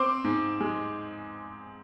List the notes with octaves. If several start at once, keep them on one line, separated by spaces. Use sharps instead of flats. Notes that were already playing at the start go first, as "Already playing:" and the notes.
Already playing: C4 C6 D6
G#2
G#3